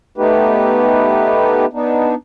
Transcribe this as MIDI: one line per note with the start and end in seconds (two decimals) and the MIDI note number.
0.18 1.65 57
0.18 1.65 59
0.18 1.65 63
0.18 1.65 67
0.18 1.65 71
1.73 2.15 59
1.73 2.15 62
1.73 2.15 63